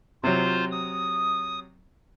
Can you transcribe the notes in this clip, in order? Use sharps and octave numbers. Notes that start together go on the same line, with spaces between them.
C3 F#3 F4 C5
D#6